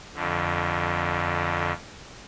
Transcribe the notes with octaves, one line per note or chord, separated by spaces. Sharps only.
F2 D3